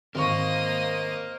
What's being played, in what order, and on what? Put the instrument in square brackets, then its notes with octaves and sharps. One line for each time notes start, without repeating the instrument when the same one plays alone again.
[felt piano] G#1 C#6 [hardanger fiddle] A#3 C5 [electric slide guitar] A#4 F5 [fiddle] D#5 D#6